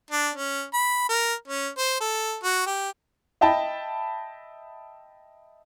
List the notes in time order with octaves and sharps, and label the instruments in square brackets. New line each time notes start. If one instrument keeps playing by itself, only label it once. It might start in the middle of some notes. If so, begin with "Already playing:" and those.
[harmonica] D4
C#4
B5
A#4
C#4
C5
A4
F#4
G4
[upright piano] D#5 E5 G5 A5 B5